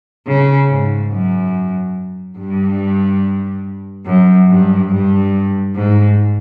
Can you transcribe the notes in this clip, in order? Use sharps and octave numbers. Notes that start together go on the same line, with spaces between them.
C#3
G#2
F#2
G2
F#2
G2
G2
G#2